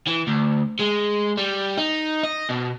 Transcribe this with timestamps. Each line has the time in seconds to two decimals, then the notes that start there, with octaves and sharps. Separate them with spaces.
0.07 E3
0.27 D2
0.79 G#3
1.38 G3
1.78 D#4
2.23 D#5
2.49 B2